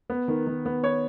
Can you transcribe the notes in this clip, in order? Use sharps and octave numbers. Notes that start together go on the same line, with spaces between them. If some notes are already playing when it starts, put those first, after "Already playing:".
B3
D#3
D#3
B3
B3 C#5